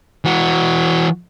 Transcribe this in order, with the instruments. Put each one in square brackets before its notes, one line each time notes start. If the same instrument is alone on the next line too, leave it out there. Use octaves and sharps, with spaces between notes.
[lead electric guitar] E3 F#4